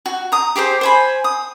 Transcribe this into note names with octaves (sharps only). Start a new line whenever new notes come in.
F#4
A#5 D#6
G4 G#4 A#4 C5
C5 G#5 B5
D#6